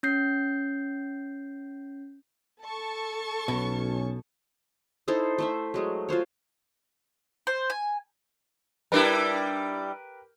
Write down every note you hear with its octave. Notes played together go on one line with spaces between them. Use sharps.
C#4 G6 C7
A4 A5 C#6
B1 B2 C#4
D#4 E4 A4 C5
A3 C5 E5
F#3 G#3 A3
F4 F#4 C5 C#5
C5
G#5
G3 D4 E4 G4 A#4 B4